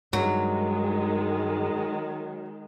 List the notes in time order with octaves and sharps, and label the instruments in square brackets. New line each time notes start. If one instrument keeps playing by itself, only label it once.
[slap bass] G2 [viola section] D#3 G#3 [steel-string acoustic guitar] F#3